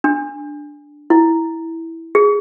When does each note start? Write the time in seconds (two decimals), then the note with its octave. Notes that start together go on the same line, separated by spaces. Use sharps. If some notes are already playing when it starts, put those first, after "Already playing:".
0.04 D4
1.10 E4
2.15 G#4